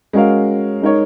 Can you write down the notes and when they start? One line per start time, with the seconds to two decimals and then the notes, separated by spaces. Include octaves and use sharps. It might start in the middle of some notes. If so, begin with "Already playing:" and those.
0.13 G#3 C#4 F#4 A#4 F5
0.82 G#3 D#4 A#4 C#5